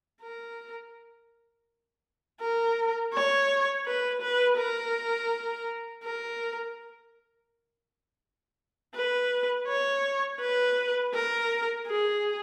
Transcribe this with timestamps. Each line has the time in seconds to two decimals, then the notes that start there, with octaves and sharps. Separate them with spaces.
0.21 A#4
2.41 A#4
3.13 C#5
3.86 B4
4.22 B4
4.58 A#4
6.04 A#4
8.95 B4
9.68 C#5
10.40 B4
11.14 A#4
11.86 G#4